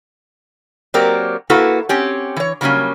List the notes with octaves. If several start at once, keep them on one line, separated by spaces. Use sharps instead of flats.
F#3 A#3 C4 G4 A#4 D5
A#3 E4 F#4 A4 B4
C4 C#4 G4
E3 C#5
C#3 F#3 G3 A#3 C#4